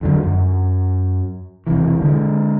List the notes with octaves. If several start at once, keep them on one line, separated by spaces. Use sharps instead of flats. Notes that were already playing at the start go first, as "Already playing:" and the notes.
F2 D3 F#3
F#2
E1 E2 C3 E3
D3 G#3